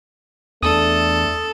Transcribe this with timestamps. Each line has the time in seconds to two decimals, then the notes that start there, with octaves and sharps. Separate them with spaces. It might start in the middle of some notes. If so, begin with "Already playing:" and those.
0.63 E2 A3 D4 A4 D#6